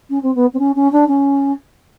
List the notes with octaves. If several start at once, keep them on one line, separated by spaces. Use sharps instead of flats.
C#4
C4
B3
C4
C#4
C#4
D4
C#4